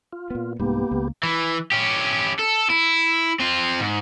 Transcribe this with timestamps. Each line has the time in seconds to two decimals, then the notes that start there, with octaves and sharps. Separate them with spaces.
0.13 F4
0.30 A#2 B3
0.60 C2 G#2 A#3 B3 G4
0.91 C#2
1.23 E3
1.72 C#4 G4
2.39 A4
2.70 E4
3.40 C4 F4
3.80 G#2